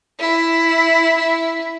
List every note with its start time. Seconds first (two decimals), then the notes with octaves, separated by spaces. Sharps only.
0.20 E4
1.17 E4